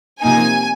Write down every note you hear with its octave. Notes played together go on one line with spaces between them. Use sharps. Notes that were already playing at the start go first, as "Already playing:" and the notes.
C3 F3 A#3 D#4 G#5